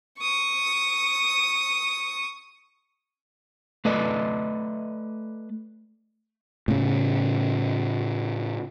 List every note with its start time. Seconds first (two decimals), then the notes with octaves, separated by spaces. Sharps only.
0.19 C#6 D#6
3.85 A3 B4 D5 D#5
6.68 A2 C#3